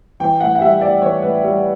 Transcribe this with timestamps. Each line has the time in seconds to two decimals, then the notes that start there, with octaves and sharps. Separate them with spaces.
0.20 E3 G5
0.40 A2 F#5
0.55 F#5
0.61 G3 E5
0.81 A2 D5
1.02 E3 C#5
1.23 A2 B4
1.44 G3